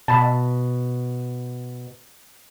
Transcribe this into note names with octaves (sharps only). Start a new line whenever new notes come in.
B2 A5 B5